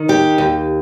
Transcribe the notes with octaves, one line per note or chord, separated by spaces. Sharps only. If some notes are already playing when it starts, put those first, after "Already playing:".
Already playing: D#3
D#2 G4
D#2